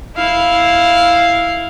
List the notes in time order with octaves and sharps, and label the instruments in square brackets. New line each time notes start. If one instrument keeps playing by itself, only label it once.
[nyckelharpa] E4 F5